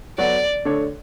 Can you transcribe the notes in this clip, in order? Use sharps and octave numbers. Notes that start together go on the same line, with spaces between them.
F#3 B3 F#4 A4 D5
D3 A3 D4 A4 C#5